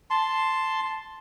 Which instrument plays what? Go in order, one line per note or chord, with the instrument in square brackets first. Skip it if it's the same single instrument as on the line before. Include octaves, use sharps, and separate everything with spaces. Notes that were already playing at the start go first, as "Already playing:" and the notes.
[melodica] A5 C6